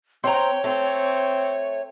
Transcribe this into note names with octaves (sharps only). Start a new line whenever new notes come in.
C4 C#5 G5 A#5
A3 C4